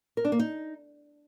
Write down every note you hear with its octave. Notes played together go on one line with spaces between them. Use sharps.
A#4
D4
A#3
D#4